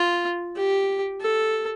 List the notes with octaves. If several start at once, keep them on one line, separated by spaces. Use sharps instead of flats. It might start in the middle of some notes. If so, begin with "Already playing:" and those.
Already playing: F4
G4
A4